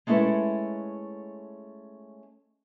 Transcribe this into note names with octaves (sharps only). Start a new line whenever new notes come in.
G#3 A3 C#4 E4 A4 B4